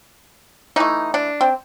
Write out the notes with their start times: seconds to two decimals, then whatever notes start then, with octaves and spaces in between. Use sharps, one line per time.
0.76 E3 A3 D#4
1.14 D4
1.41 C4